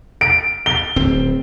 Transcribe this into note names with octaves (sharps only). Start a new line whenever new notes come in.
D7
G7
D1 C4